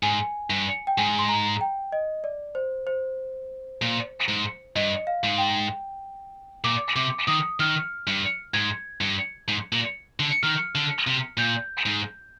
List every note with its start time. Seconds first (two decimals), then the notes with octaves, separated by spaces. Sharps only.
0.03 G#2 G#5
0.50 G2
0.87 G5
0.98 G#2 G#5
1.19 C6
1.29 A#5
1.61 G5
1.92 D#5
2.24 D5
2.55 C5
2.87 C5
3.82 A#2
4.28 G#2
4.76 G2 D#5
5.07 F5
5.24 G#2
5.38 G5
6.64 A#2 D6
6.96 C3 D6
7.27 D#3 D#6
7.60 D#3 F6
8.07 G2
8.53 G#2 G#6
9.01 G2
9.48 G#2
9.73 A#2
10.20 D3
10.43 D#3 F6
10.75 D3
11.07 C3
11.38 A#2 G6
11.86 G#2